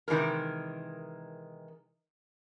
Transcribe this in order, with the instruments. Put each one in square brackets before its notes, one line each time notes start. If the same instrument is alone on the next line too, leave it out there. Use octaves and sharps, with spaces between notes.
[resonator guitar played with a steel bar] C3 D#3 E3 G#3 A#4